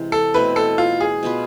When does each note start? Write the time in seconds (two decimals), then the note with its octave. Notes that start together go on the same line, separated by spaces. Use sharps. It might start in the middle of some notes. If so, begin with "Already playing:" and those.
Already playing: C3 E3 G#3
0.12 A4
0.34 B2 A3 C4 E4 B4
0.56 A4
0.78 F4
1.01 G#4
1.23 B2 B3 F4 B4